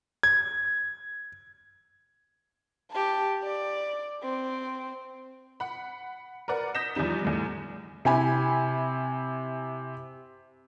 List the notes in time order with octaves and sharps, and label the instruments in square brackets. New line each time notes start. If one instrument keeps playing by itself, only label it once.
[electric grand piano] G#6
[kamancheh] G4 A5
D5
C4
[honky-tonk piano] F#5 B5
A#4 B4 D5 F#5
D#6 G6 A#6 B6 E7
E2 F3 G3 D#4 E7
E2 A2
[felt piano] C3 E4 G#5 B5